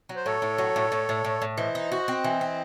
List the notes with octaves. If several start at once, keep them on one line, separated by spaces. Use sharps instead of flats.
F#3
C5
A2 A4 C#5
A2
F#3
A2
A2
A2
A2
A2
E3 C5 D#5
D#4
F#4
C4
E3
C4